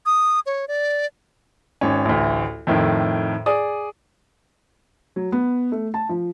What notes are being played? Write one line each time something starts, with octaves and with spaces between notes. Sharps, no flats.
D#6
C#5
D5
G#1 C#4
A1 D2
F2 A2 D#3
G#4 D5 D#6
F#3
B3
A3
A5
F3